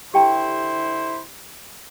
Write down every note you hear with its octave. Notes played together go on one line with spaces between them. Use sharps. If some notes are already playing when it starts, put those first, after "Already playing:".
D3 E4 G4 C5 G5 A5